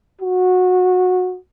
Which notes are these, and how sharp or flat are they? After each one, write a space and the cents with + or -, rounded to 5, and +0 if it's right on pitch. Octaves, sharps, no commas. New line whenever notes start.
F#4 -20